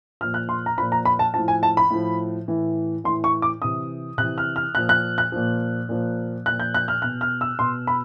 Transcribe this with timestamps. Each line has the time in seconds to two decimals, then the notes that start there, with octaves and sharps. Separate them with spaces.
0.21 A#2 F3 F6
0.34 F#6
0.49 C6
0.66 A#5
0.78 A#2 F3 B5
0.92 A#5
1.05 B5
1.19 A5
1.34 A2 F3 A5
1.48 G#5
1.63 A5
1.77 B5
1.90 A2 F3
2.48 A2 E3
3.04 A2 E3 C6
3.24 C#6
3.42 D6
3.62 C3 E3 D#6
4.18 C3 F#6
4.22 E3
4.38 F6
4.56 F6
4.75 A#2 F3 F#6
4.89 F#6
5.18 F#6
5.32 A#2 F3
5.89 A#2 F3
6.46 A#2 F3 F#6
6.60 G6
6.74 F#6
6.88 F6
7.02 B2 F#6
7.21 F6
7.41 E6
7.59 B2 C6
7.87 B5